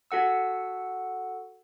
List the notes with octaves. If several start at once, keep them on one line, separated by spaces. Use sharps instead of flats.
F#4 A4 F#5 E6